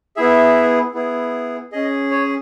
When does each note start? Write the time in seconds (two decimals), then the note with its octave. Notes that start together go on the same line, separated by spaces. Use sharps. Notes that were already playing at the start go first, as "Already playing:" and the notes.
0.16 B3 E4 G#4 E5
0.94 B3 E4 G#4
1.72 C#4 G#4 D#5
2.11 C#5